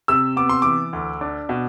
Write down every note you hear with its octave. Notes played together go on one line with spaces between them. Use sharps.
C3 E6
B3 D6
C6
E3 D6
D2
D4
B2